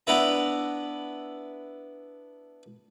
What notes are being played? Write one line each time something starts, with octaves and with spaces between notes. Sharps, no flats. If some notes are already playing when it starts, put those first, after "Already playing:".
B3 D4 E4 B4 E5 A#5